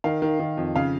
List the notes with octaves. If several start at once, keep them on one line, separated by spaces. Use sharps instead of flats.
D#3 F5
D#3
D#3
F2
C#3 F5